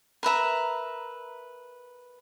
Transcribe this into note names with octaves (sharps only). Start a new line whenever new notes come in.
A#4 B4 E5 A#5